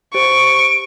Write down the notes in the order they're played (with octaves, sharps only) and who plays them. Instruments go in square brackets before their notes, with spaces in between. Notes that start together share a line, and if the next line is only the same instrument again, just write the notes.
[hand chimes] G4 C5 [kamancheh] C#6 [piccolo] D7